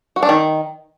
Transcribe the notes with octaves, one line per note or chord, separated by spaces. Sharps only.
F#4
D4
D#3